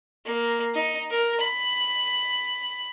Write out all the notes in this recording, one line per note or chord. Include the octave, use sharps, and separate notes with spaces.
A#3
D#4
A#4
B5